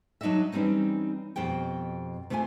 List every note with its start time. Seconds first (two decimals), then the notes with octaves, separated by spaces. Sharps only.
0.21 F#3 D4 D#4 F#4 D#5 E5
0.52 E3 G3 C4 C#4 D#4
1.36 F2 B2 G4 G5
2.30 C3 A3 F4 C5 G#5